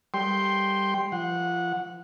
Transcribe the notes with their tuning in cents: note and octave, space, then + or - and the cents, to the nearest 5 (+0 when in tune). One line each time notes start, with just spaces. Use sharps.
G3 +0 G5 +0 C6 +5
F3 -25 F#5 -15